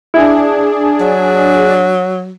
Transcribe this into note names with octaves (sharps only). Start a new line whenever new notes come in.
D4 E4 G#4
F#3